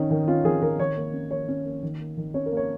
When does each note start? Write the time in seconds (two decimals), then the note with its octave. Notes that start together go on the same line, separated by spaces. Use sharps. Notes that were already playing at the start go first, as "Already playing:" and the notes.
Already playing: D#3 C#4 D#4
0.11 D#3
0.28 C#4 F4
0.44 D#3 G#4
0.62 D#3 A#4
0.79 D#3 C#5
0.97 A#3
1.13 C#4
1.31 A#3 C#5
1.48 C#4
1.65 A#3
1.83 D#3
2.00 A#3
2.17 D#3
2.34 C#4 C#5
2.46 A#4
2.52 A#3
2.57 C#5